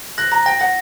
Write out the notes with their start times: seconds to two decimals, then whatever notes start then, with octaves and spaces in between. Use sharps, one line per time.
0.18 F#6 A#6
0.32 A#5 A#6
0.46 G5 A#6
0.60 F#5 A#6